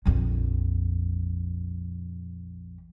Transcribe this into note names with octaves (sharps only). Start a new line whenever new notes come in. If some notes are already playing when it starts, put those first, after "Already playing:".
A#1 F2